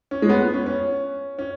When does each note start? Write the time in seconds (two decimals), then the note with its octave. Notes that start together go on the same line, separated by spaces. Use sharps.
0.11 C#4
0.22 G#3
0.29 B3
0.54 C#4
0.66 C#4
1.39 C#4